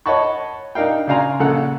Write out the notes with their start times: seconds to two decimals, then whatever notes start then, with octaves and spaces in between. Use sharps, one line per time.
0.06 C#5 D#5 F#5 A5 B5 C#6
0.75 D4 D#4 A#4 F5 G5
1.07 C#3 D5 F5 G#5 A#5 C6
1.40 A#1 C#3 A4 F#5